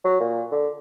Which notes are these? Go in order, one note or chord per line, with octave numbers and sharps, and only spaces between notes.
F#3
A#2
D3